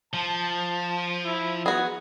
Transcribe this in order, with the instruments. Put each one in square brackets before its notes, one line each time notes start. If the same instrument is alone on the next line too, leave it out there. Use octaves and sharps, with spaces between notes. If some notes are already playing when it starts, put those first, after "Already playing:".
[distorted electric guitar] F3 [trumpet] A5
[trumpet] E4
[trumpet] B3 [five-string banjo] F#4 G#4